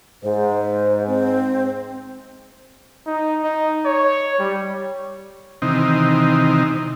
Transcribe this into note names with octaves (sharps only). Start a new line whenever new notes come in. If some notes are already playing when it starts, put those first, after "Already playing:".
G#2 C5
C4
D#4
D#4
C#5
G3
C3 D#3 E3 C4 D#4